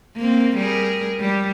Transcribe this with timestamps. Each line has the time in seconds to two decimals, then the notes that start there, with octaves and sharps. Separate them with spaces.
0.16 A#3 C4
0.57 G3 G#4 A#4
1.20 G3